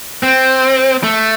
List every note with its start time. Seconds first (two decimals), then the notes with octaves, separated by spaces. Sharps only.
0.23 C4
1.03 A3